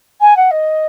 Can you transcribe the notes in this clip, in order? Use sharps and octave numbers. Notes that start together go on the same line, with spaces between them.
G#5
F#5
D#5